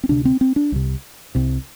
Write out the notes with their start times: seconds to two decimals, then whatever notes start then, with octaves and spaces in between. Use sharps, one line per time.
0.04 C4
0.09 D2 C3 D4
0.25 C4
0.41 C4
0.56 D4
0.72 C2 C3
1.35 C2 C3